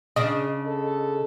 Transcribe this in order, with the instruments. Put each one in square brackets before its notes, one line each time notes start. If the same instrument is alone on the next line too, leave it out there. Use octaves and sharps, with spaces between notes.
[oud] C#3 D4 [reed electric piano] D#5
[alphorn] A4